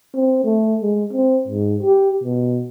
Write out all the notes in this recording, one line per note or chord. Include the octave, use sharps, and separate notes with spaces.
C4
A3
G#3
C4
G#2
G4
B2